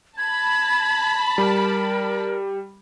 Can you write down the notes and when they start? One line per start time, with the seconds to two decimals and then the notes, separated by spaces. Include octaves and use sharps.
0.18 A5 B5 G#6
1.38 G3 A#4